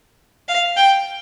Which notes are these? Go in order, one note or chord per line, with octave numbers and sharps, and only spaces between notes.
F5
G5